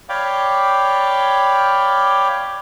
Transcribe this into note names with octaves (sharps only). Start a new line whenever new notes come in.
C#5 D5 F5 G5 B5 D6